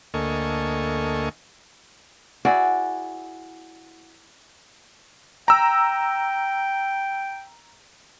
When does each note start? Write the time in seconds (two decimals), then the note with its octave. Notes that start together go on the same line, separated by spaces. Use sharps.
0.14 D2 A#3 A4 D#5 G#5 C#6
2.45 E4 F#4 G#4 D5
5.48 G5 A#5 E6